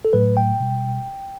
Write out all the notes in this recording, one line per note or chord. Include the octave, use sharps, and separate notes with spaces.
A4
A2 F#3 A3 B4
G5
B2 G3